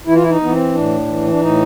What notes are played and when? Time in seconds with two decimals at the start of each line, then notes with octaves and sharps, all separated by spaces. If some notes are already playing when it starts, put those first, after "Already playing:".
0.07 E3 E4
0.15 F4
0.22 E4
0.30 D#4
0.41 E3 B3
0.52 C4
0.74 A2 D4
1.07 E3
1.31 D4
1.41 A2 D#4